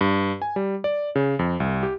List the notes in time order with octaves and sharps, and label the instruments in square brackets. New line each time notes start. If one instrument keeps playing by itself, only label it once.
[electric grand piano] G2
G#5
G3
D5
C#3
F2
C2
G4